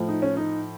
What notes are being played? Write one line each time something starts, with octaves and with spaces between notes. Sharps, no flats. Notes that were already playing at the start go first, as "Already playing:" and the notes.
Already playing: A2 F3
D#4
C#4
D#4